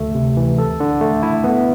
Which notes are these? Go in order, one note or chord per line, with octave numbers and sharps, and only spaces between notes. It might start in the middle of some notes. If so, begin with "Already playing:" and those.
Already playing: D2 A3
C3
E3
A4
D3
A3
E4
B3